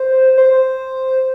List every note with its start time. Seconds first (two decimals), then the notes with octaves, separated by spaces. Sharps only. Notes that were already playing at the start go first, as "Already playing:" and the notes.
Already playing: C5
0.38 C5